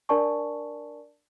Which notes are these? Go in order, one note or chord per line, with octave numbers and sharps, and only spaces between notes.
D4 A#4 D5 G#5 A5 C#6